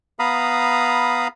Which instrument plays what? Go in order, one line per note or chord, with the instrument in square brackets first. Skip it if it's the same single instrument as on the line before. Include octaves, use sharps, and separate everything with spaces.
[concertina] B3 F5 A#5 B5 D#6